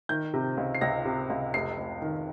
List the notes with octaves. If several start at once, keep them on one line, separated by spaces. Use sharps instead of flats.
D#3 G6
C3
C#2
C7
C#2 A#6
C3
C#2
F1 C7
F1
D#3